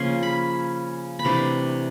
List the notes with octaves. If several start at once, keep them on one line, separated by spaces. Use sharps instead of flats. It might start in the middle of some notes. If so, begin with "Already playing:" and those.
Already playing: C#3 F3 A#3 C#4 C6
B5
B5
C3 E3 A3 D4 A#5